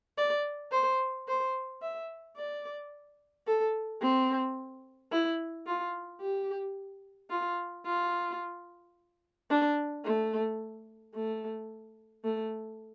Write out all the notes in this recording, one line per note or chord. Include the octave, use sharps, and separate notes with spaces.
D5
C5
C5
E5
D5
A4
C4
E4
F4
G4
F4
F4
D4
A3
A3
A3